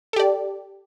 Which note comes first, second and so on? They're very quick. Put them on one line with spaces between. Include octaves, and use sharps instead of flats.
A4 G4 D5